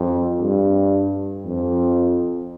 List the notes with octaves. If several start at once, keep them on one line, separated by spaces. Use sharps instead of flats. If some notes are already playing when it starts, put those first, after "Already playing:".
Already playing: F2
G2
F2